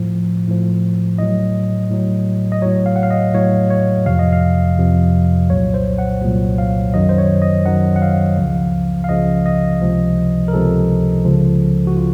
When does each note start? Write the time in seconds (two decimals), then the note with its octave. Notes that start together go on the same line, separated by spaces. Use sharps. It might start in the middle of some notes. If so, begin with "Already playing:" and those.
Already playing: A2 F3
0.47 A2 F3
1.19 A2 F#3 D#5
1.91 A2 F#3
2.52 D#5
2.62 A2 F#3 C#5
2.86 F5
2.96 F#5
3.03 F5
3.11 D#5
3.34 A2 F#3 C#5
3.70 C#5
4.06 F2 C3 F3 F5
4.19 D#5
4.33 F5
4.78 F2 C3 F3
5.50 C2 A#2 F#3 C#5
5.74 C5
5.98 F#5
6.22 C2 A#2 F#3
6.58 F5
6.94 F#2 D#3 F#3 D#5
7.09 C5
7.18 C#5
7.42 D#5
7.66 F#2 D#3 F#3 F#5
7.96 F#5
8.02 F5
8.37 C#2 C#3 F3
9.04 F5
9.09 C#2 C#3 F3 D#5
9.46 D#5
9.81 C#2 C3 F3
10.48 A#4
10.53 C#2 C3 F3 A4
11.25 C#2 C#3 F3
11.87 F#4
11.97 F4